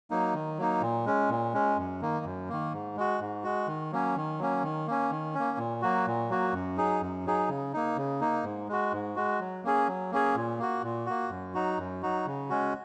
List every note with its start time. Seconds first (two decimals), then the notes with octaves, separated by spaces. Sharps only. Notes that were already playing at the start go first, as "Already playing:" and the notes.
0.10 F#3 A#3 D#4
0.34 D#3
0.58 F#3 A#3 D#4
0.82 A#2
1.06 G#3 C#4
1.30 A#2
1.54 G#3 C#4
1.77 F#2
2.02 D#3 A#3
2.25 F#2
2.49 D#3 A#3
2.73 G#2
2.97 G#3 F#4
3.20 G#2
3.44 G#3 F#4
3.68 D#3
3.92 F#3 A#3 C#4
4.16 D#3
4.39 F#3 A#3 C#4
4.63 D#3
4.87 A#3 C#4
5.11 D#3
5.35 A#3 C#4
5.58 A#2
5.82 F#3 A#3 F#4
6.06 A#2
6.29 F#3 A#3 F#4
6.54 F#2
6.77 F#3 D#4 G#4
7.02 F#2
7.26 F#3 D#4 G#4
7.49 C#3
7.73 A#3 D#4
7.97 C#3
8.21 A#3 D#4
8.44 G#2
8.69 G#3 F#4
8.93 G#2
9.16 G#3 F#4
9.40 F#3
9.63 A#3 C#4 G#4
9.87 F#3
10.12 A#3 C#4 G#4
10.35 A#2
10.58 A#3 F#4
10.83 A#2
11.06 A#3 F#4
11.30 F#2
11.54 F#3 D#4 F#4
11.78 F#2
12.03 F#3 D#4 F#4
12.26 C#3
12.50 G#3 C#4 F#4